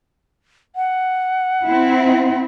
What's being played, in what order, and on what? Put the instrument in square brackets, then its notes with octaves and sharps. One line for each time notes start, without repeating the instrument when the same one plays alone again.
[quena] F#5
[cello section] C4 E4